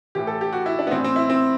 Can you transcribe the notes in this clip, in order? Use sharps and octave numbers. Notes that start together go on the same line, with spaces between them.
A2 E3 G4
A4
G4
F#4
E4
D4
B3
A2 E3 C4
C4
E4
C4